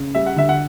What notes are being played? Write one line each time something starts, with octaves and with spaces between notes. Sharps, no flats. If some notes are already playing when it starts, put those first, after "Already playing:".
Already playing: C#3
G3 E5
F#5
D3 E5
F#5